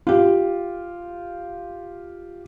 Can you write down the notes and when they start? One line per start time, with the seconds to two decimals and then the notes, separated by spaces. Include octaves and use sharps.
0.07 F4 G4